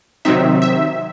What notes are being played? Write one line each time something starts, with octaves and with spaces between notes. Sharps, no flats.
C3 D#3 F#3 C4 D#4 E5
E5